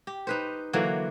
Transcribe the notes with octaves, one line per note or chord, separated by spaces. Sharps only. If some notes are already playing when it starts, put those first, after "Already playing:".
G4
D#4 B4 C5
D3 E3 F#3 A#3